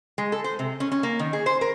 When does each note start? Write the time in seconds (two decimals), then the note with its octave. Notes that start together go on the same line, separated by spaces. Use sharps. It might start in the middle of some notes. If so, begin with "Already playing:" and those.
0.18 G#3
0.32 A4
0.44 C5
0.59 C3
0.80 C#4
0.92 C#4
1.03 A#3
1.19 D#3
1.33 G#4
1.46 C5
1.61 A#4